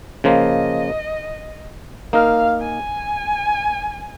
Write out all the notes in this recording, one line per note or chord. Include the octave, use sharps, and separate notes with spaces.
C#3 F3 A#3 F4 D#5
A#3 D#4 A#4 F5
G#5